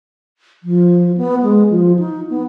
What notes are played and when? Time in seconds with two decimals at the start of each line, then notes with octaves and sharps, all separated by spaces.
0.63 F3
1.17 B3
1.43 G#3
1.70 F3
1.99 D#4
2.30 B3